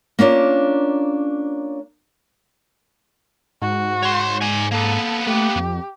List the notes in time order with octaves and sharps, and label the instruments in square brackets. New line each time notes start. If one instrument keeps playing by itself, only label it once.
[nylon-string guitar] A#3 C#4 D4 F4
[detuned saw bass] G#2 [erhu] F#4
[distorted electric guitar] C#5 C6
D5 G#5
[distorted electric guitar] A#3 B3 [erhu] A4
[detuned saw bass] A3 [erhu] G4
[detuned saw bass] F2